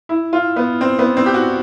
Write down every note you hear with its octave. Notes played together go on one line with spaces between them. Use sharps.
E4
F4
B3
C4
B3
C4
G4
F#4